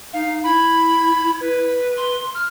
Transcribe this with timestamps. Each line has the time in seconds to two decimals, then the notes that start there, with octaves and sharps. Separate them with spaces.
0.13 D#4 F5
0.44 E4 B5
1.41 B4
1.97 C6
2.34 F6